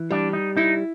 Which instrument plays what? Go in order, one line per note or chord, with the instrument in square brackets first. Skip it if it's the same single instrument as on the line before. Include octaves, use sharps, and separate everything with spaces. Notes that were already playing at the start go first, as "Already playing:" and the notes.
Already playing: [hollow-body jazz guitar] E3
[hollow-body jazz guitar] G3 [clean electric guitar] D4
[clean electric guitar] D#4
[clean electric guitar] D#4 [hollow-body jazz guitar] E4